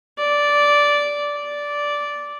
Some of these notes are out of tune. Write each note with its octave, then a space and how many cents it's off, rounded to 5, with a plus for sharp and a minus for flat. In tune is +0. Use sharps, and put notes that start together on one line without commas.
D5 -10
D5 -10